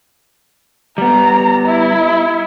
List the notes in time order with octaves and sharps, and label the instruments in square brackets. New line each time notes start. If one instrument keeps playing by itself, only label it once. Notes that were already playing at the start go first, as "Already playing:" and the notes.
[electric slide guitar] G3 B3 [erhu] A#5
[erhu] E4